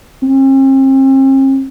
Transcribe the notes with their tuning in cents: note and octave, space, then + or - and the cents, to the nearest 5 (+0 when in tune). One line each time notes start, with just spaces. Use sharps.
C4 +45